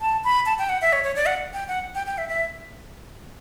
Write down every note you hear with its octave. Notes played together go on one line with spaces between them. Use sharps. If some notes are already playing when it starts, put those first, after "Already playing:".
A5
B5
A5
G5
F#5
E5
C#5
C#5
D5
F#5
G5
F#5
G5
G5
E5
E5